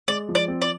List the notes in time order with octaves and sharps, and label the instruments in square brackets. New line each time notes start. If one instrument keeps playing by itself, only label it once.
[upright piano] G#3 [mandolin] D5
[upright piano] F3
[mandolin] D5
[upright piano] C4
[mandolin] D5